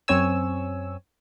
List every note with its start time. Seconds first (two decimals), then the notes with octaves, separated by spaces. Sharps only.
0.08 F#2 C4 C#5 G#5 E6